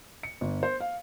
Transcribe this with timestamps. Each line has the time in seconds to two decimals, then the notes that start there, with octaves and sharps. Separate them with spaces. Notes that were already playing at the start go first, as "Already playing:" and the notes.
0.23 C#7
0.41 G1
0.63 C5
0.80 F5